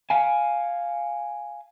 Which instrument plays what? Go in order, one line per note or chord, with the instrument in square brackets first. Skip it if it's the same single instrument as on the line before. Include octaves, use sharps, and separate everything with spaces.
[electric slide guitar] F5 G#5